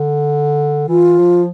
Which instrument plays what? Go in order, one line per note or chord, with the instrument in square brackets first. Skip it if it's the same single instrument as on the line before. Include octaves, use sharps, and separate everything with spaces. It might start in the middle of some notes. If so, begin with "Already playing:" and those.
Already playing: [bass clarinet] D3
[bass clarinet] E3 [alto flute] F4
[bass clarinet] F3